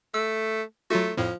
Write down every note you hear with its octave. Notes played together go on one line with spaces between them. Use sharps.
A3 E6
F#3 A3 F4 F#4
F2 A2 F3